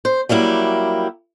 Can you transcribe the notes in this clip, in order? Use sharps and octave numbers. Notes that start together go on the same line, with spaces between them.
C5
F#3 G3 A#3 E4 G4